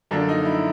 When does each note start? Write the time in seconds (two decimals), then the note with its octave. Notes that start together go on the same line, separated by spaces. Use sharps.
0.11 F#2 D3 F3 A#3 D4
0.29 D#4
0.45 E4